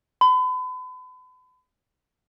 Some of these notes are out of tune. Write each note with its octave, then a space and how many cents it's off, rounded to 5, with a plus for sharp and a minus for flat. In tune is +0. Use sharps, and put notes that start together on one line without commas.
B5 +40